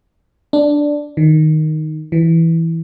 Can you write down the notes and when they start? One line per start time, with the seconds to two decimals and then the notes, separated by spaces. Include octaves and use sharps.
0.53 D4
1.17 D#3
2.12 E3